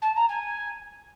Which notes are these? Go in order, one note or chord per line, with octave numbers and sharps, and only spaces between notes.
A5
A#5
G#5